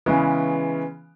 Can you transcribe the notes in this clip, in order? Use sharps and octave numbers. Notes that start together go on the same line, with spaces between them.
C#3 E3 G#3 B3 C#4